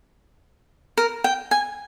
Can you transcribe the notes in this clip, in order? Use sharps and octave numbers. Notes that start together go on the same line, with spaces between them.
A#4
G5
G#5